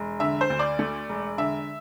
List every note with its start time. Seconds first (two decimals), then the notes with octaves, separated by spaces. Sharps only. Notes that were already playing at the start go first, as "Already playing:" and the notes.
Already playing: E1
0.20 D3 E5
0.41 C5
0.50 D2
0.59 D5
0.79 A3
1.09 E1
1.38 D3 E5